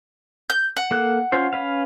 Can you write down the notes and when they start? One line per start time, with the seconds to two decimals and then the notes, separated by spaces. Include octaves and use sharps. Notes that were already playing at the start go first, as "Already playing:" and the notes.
0.50 G6
0.77 F#5
0.91 A#3 A4 F#6
1.32 C#4 F4 C5
1.53 C#4 B4 F5